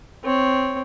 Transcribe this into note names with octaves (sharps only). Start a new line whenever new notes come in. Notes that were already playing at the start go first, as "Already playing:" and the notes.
C4 C#5